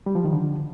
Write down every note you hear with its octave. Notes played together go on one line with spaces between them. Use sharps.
G3
F3
D#3
D3